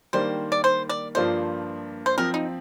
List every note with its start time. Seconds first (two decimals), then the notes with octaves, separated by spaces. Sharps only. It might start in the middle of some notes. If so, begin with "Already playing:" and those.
0.13 D#3 G3 A#3 D4 C5
0.52 D5
0.64 C5
0.89 D5
1.15 G2 F3 A#3 D4 F4 C5
2.06 C5
2.18 F3 C4 F4 A#4
2.34 D#4